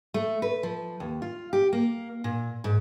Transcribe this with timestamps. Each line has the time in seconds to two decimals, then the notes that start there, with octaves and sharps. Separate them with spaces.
0.14 A3
0.42 B4
0.63 F3
1.00 D#2
1.22 F4
1.53 G4
1.73 A#3
2.24 A#2
2.64 G#2